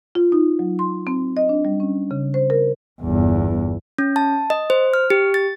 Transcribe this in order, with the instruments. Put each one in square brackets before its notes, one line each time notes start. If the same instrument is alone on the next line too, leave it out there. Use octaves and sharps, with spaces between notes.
[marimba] F4
D#4
F#3
C6
C4
D#5
D4
G3
C#4
C#3
C5
A#4
[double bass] G1 E2
[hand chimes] C#4
A5
D#5
C5
F6
G4
A6